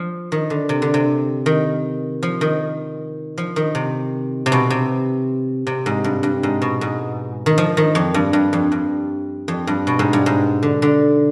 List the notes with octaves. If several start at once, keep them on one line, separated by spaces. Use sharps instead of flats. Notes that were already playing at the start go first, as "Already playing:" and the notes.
Already playing: F3
D#3
D3
C3
D3
C3
D#3
F3
D#3
F3
D#3
C3
C3
B2
C3
C3
G#2
G2
G2
G#2
B2
G#2
D#3
F3
D#3
F2
G2
G2
F2
G2
F2
G2
B2
G#2
G2
G#2
D3
D3